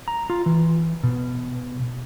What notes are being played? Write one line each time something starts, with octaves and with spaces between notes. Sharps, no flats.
A#5
F4
E3
B2